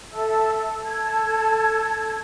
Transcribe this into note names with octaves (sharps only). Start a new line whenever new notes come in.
A4 E5 A5 E6
A4 A5 G#6